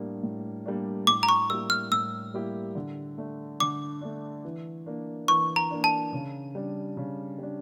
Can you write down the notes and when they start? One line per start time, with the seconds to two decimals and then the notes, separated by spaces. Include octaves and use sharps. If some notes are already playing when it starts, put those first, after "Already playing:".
Already playing: A2 G3 A#3 D4
0.23 A2
0.66 G3 A#3 D4
1.07 A2 D6
1.23 A#5
1.29 C#6
1.50 G3 A#3 E4 G4 E6
1.70 F6
1.92 A2 E6
2.34 G3 A#3 E4 G4
2.75 D3
3.18 A3 D4
3.60 D3 D6
4.01 A3 D4
4.45 E3
4.86 A#3 D4
5.28 E3 C#6
5.56 A#5
5.71 A#3 D4
5.84 A5
6.13 C#3
6.55 G3 D4
6.97 C#3
7.38 G3 D4